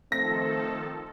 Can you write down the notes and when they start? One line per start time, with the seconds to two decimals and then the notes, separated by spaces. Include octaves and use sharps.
0.12 D#3 F3 A3 C4 A4 A#6